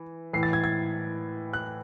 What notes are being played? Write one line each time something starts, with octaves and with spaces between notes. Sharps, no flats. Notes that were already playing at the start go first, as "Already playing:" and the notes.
Already playing: E3
A2 E3 C7
A6
G#6
G#6
F#6